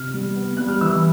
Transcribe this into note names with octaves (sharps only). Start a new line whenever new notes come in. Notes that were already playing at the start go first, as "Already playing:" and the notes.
Already playing: C3 F6
G3
B3
G3 F#6
F6
E3 E6